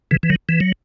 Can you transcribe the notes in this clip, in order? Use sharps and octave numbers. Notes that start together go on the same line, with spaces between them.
C#3 E3
E3
D#3 F#3
E3
F#3